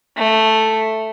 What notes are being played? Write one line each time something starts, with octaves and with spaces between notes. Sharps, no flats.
A3